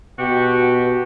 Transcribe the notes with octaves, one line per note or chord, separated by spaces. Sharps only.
B2 F#4 G4